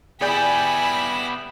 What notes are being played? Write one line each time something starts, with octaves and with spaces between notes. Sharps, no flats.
B3 E4 G4 G#4 D5 G#5 B5 G6